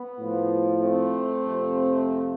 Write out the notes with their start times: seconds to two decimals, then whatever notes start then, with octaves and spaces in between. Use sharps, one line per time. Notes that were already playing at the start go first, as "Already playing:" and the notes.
Already playing: B3
0.19 A2 F3
0.81 A3 C4
1.45 F2 C3 F3